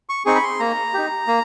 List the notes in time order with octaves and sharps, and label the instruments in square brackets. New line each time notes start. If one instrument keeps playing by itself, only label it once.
[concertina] C#6
C4 D#4 G#4 C#6
B5
C6
A#3 A#5
D#4 G4
A#3